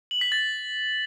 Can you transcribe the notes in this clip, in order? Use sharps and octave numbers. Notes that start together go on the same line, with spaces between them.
F#7
B6
A6